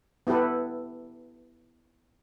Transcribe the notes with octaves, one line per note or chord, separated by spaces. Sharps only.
B3 E4 G4 A4 B4